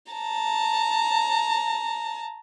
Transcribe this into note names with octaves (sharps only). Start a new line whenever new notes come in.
A5 A#5